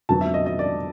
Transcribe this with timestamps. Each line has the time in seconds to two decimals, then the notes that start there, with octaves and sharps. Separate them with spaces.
0.09 F2 D3 F#3 B3 A5
0.21 E5
0.34 D#5
0.46 D#5
0.59 D5